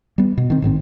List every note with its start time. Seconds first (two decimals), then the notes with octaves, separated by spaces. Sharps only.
0.18 G3 B3
0.37 B2
0.50 D#3 C4
0.62 A1 G#2 D#3 C4